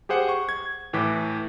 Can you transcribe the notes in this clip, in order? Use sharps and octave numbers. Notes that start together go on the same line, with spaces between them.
G4 G#4 C5 F#5
C#6
G#6
A2 E3 D6 B6